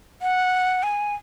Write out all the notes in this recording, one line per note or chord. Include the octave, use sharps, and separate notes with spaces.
F#5
G#5